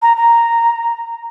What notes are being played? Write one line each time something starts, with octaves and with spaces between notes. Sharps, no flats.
A#5
A#5